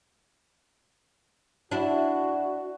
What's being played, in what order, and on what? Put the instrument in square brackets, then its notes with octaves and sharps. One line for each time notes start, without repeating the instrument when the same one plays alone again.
[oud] D4 E4 [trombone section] F#4